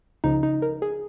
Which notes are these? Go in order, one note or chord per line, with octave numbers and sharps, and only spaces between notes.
C#2 C#3 F3 D#4
D#4
A#4
G#4